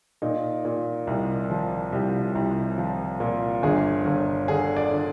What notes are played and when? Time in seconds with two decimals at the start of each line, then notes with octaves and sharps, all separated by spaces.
0.22 A#2 D#4
0.65 A#2
1.07 C2
1.50 F3
1.92 C2 G4
2.35 C2
2.78 F3
3.20 A#2
3.63 G1 G#4
4.05 G1
4.48 D3 G#4
4.77 D5
4.91 D3